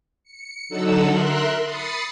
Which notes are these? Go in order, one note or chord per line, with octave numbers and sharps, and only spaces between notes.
C#7
D3 F#3 D#4 A4 F#5 E6
A#4 E5 C6 F#6
B5 D#6 A6 C7 C#7